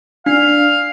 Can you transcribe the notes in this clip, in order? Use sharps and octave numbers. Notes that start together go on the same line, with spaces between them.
D4 F5